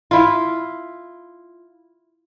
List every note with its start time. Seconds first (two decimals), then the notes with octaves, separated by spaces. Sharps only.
0.11 E4 F4